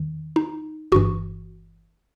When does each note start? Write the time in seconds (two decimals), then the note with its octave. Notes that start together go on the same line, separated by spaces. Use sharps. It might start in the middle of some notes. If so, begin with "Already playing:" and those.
Already playing: E2 D#3
0.36 D#4
0.92 G1 G2 E3 F#4